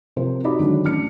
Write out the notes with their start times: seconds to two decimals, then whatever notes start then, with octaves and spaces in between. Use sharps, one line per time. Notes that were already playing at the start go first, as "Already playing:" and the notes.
0.16 C3 F3 A#4 C5
0.44 D#4 F#4 G4 D5 B5
0.59 D3 D#3 F#3 G#3 D4
0.84 A1 D4 F6 C#7